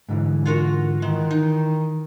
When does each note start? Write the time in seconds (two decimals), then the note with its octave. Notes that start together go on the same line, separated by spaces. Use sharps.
0.09 G#2 D3 E3
0.46 F4 F#4 A#4
1.02 D#3 E3 G#3
1.31 D#4